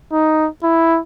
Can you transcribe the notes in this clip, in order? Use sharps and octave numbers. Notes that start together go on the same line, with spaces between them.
D#4
E4